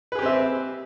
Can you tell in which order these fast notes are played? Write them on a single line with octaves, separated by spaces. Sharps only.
B4 G#4 G4 C4 E5